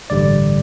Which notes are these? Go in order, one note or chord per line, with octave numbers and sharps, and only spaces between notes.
A1 G2 D3 G3 D5